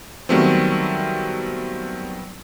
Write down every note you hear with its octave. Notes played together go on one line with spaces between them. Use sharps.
D#3 F#3 G3 A3 B3 C4